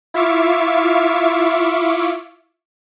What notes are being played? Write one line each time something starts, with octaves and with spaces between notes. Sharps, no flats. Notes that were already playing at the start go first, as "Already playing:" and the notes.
E4 F4 E5 F5 C#6 D6